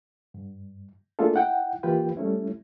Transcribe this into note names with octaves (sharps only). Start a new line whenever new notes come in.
G2
A3 A#3 D4 F4 G#4 A4
E4 F#5 G5
E3 A#3 F4 G4 B4 G5
G3 A3 C#4 E4